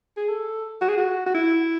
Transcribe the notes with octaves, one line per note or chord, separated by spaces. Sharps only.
G#4
A4
F#4
G#4
F#4
F#4
E4